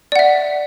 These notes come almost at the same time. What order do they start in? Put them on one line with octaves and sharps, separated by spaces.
D5 F#5 E5